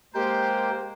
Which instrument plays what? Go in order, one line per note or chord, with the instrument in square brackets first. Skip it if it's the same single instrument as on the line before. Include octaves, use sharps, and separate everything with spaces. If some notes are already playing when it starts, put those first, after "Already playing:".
[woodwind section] G#3 A#3 C5 [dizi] G4 [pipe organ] A#4 G5